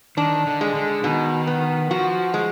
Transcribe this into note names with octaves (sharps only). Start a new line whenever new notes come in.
D#3 D4
D3
G#3
D3
B2 D#3
B3
F3 F#4
G#3